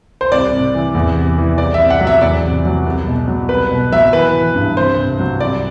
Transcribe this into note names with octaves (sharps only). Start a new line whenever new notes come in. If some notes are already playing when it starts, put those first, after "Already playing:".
C5
C2 D5
C3
E3
E2
C3
E3
C2 D5
E5
C3
F#5
F#3
E5
E2 D5
C3
F#3
C2
B2
F#3
C2 B4
B2
F#3 E5
E3 B4
E3
G2
C2 C5
C3
F#3
C2 D5